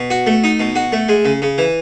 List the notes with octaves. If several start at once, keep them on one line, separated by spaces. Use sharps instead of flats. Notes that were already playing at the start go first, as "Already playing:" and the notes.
Already playing: B2
F#4
A3
D#4
B2
F#4
A3
G#3
C#3
C#3
E3